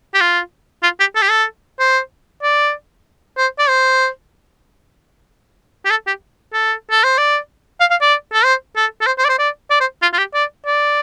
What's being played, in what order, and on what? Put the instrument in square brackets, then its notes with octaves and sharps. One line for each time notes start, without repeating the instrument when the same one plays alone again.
[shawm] G4
F4
F4
G4
A4
G4
A4
C5
D5
C5
D5
C5
G4
A4
G4
A4
A4
C5
D5
F5
F5
D5
A4
C5
A4
A4
C5
C5
D5
C5
D5
D5
C5
F4
F4
G4
D5
D5